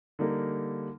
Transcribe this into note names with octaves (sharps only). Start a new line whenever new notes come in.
D3 G3 A#3 D#4 A#4